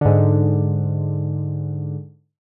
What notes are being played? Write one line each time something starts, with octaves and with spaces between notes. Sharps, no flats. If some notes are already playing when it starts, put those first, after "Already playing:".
G#2 D3